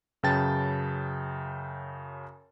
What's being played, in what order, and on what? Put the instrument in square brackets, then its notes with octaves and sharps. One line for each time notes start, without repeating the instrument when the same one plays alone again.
[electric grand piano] F#2 C#3 B4 G5 A5 A6